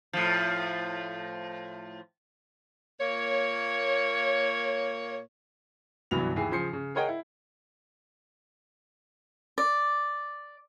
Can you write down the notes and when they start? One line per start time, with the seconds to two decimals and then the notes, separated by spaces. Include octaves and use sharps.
0.13 A2 F3
2.99 A#2 A#3 C#5
6.11 G1 C2 E3 F#3 B3 F7
6.36 D#2 E3 G#4 C7
6.51 C#3 F3 C5 C7 C#7
6.73 C#3
6.95 G#4 A#4 C#5 D#5 F#5 G5
7.08 E4
9.58 D5